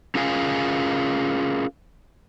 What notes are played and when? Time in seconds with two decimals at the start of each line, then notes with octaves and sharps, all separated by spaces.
0.15 C#4 F4 G#4 A#4 F5 G#5